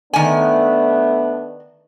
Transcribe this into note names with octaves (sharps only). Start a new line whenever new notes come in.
D#3 A3 B3 D4 G#5